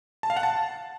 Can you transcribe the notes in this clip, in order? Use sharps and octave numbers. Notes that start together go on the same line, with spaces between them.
A5
F5
F#5
A5